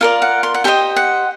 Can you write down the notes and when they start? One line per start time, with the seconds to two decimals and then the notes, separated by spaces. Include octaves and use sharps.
0.01 F4 A#4 D5 F5
0.22 F#5
0.43 C6
0.54 F#5
0.64 G4 C5 D#5 G5
0.96 F#5